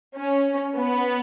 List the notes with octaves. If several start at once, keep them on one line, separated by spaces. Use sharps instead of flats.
C#4
B3